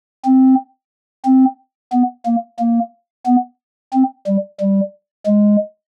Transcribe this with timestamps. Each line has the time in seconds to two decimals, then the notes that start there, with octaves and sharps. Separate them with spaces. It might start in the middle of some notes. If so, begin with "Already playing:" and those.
0.25 C4
1.25 C4
1.93 B3
2.26 A#3
2.59 A#3
3.26 B3
3.93 C4
4.26 G3
4.60 G3
5.26 G#3